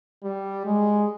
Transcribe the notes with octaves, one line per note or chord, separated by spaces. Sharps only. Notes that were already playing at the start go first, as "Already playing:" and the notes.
G3
G#3